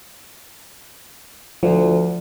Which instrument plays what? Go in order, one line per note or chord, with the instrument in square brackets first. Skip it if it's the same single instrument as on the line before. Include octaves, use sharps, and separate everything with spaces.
[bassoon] D2 [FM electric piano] F3